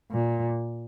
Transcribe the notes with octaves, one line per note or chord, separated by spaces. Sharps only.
A#2